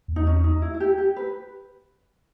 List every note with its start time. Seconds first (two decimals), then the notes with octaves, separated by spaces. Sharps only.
0.08 E2
0.16 D#4
0.27 C#4
0.44 D#4
0.62 E4
0.74 E4
0.80 G4
0.98 G4
1.16 B4